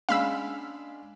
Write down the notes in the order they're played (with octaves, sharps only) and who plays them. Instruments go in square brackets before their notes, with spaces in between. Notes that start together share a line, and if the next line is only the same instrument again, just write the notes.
[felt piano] G#3 C#4 D4 [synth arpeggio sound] F5 B5 E6